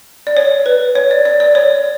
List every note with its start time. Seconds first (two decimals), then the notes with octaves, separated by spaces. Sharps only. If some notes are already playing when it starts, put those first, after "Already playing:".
0.27 D5
0.37 C#5
0.66 B4
0.95 C#5
1.11 D5
1.25 D5
1.40 D5
1.55 C#5